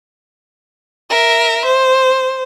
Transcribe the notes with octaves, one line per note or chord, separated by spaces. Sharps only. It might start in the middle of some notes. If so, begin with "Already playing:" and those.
A#4 E5
C5